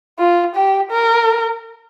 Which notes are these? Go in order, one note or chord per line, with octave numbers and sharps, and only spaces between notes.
F4
G4
A#4